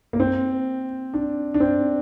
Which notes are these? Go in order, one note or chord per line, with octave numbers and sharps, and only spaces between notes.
A#3
C4
D4
D4
C4